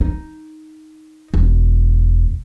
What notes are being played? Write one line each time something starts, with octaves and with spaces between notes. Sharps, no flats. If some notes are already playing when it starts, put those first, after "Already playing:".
D#4
E1